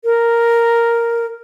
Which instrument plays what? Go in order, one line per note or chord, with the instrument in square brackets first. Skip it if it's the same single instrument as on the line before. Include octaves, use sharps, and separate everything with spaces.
[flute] A#4